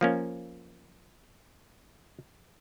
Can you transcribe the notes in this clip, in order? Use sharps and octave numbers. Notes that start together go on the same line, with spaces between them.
F3 A#3 C#4